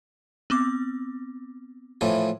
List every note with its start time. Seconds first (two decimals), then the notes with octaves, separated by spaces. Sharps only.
0.50 B3 C4 D6
2.01 A2 E3 F3